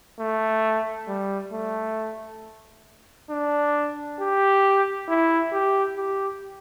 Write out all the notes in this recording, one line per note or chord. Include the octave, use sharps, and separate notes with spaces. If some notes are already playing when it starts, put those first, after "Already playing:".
A3
G3
A3
D4
G4
E4
G4
G4